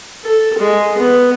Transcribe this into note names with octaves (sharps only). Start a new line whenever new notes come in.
A4
G#3
B3